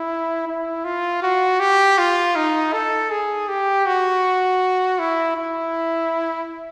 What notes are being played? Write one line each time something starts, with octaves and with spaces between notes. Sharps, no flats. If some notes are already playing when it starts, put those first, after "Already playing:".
Already playing: E4
E4
F4
F#4
G4
F4
D#4
A4
G#4
G4
F#4
E4
E4